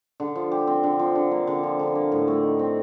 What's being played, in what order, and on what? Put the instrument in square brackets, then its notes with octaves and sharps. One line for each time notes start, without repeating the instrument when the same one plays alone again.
[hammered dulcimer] D3
F3
G4
C4
D3
F3
D3
A#3
D3
F3
D3
A#3
A2
A3
D#4
C4